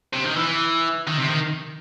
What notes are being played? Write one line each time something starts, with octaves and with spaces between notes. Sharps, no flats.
C3
D#3
E3
D#3
C3
D#3